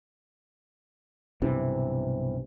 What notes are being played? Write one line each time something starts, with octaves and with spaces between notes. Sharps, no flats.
B1 G2 C3 E3